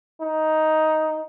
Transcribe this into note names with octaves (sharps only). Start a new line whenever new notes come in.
D#4